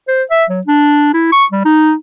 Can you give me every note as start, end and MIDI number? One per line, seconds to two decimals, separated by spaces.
0.08 0.23 72
0.31 0.44 76
0.49 0.61 54
0.67 1.09 62
1.14 1.32 64
1.32 1.45 85
1.52 1.63 55
1.65 1.93 63